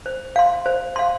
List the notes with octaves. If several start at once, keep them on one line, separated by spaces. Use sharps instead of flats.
C5
F5 C6
C5
F5 C6